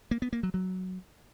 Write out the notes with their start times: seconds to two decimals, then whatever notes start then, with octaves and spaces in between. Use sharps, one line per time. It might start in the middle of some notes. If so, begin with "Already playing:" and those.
0.11 A#3
0.22 B3
0.33 A#3
0.43 F#3
0.54 F#3